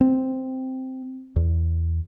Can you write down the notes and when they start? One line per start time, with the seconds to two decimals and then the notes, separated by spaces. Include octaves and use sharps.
0.01 C4
1.36 E2